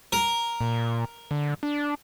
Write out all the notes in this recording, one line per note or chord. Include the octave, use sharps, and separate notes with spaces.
A#4
A#2
D3
D4